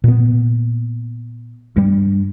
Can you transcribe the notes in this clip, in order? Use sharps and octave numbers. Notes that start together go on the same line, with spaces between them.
A#2 B3
G2 G3